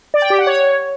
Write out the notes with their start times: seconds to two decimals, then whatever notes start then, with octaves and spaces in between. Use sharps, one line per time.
0.14 D5
0.22 G5
0.30 G4
0.38 F#5
0.47 C#5